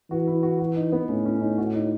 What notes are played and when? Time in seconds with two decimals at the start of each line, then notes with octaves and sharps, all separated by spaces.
0.11 E3 F#4
0.27 E4
0.43 F#4
0.59 F#4
0.76 D#4
0.92 B3
1.09 A2 C#4
1.26 C#4
1.41 D#4
1.58 F#4
1.74 D#4